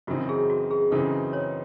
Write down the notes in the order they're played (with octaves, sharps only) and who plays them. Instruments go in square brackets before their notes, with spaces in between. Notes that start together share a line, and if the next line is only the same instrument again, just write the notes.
[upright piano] F#2 C#3 E3 C4 D#4 [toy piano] F#4
[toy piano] G#4
F#4
G#4
[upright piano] F#2 C#3 E3 C4 D#4 [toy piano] A4
[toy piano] C#5